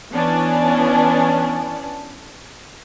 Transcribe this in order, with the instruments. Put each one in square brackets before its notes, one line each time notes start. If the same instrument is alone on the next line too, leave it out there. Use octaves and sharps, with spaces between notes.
[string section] E3 B3 C#4 D4